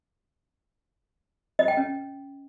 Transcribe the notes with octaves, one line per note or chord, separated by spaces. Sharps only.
D#5
G5
C#4